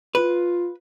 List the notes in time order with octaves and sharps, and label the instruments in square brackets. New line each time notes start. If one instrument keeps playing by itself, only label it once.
[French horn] F4 [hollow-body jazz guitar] B4